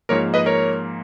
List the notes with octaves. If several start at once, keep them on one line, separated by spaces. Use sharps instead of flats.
G#2 F3 A#3 A#4 C#5
B4 D#5
A#4 C#5